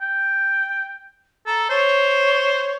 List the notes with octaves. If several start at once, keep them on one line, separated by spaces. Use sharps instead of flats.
G5
A4 A#5
C5 C#5